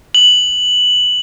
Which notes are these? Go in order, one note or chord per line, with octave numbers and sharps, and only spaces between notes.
F#7